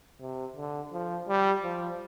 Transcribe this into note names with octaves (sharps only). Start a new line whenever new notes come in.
C3
D3
F3
G3
F3